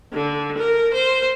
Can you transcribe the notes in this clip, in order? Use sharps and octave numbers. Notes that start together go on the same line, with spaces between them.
D3
A#4
C5